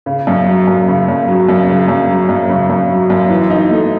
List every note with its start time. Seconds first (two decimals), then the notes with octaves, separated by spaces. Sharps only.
0.06 C#3
0.27 F#2
0.47 F#3
0.67 F#2
0.88 C#3
1.08 F#2
1.28 F#3
1.48 F#2
1.68 C#3
1.88 F#2
2.08 F#3
2.29 F#2
2.49 C#3
2.70 F#2
2.90 F#3
3.10 F#2
3.30 E3
3.50 D#4
3.71 A3